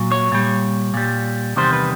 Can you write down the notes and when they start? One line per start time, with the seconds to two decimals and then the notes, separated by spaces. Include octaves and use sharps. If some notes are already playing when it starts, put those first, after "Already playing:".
Already playing: A#2 F#3
0.12 C#5
0.32 A#2 G3
0.94 A#2 G3
1.56 E2 C3 D#3 G3 C5
1.73 B4